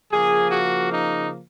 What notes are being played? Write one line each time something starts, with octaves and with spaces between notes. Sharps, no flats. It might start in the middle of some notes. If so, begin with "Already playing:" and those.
C#3 F3 A#3 G#4
F#4
D#4